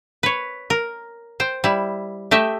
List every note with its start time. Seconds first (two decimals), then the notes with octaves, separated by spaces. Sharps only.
0.23 B4 C#5
0.70 A#4
1.40 C5 G5
1.64 G3 E4
2.31 A3 G4 D#5 E5